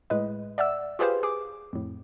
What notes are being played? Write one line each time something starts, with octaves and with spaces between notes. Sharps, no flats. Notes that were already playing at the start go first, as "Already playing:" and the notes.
A2 G#3 B4 D#5
D5 E5 F#5 E6
F4 G4 G#4 B4 C5 F5
G#4 D6
F2 A2